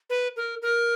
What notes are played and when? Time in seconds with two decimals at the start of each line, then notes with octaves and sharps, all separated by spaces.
0.10 B4
0.37 A#4
0.62 A#4